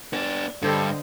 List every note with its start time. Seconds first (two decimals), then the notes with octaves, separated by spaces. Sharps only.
0.13 B3 D4 D5
0.62 G2 D3 A4 C5 D#5